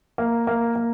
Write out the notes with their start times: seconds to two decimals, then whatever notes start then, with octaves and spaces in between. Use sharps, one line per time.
0.18 A#3
0.47 A#3
0.76 A#3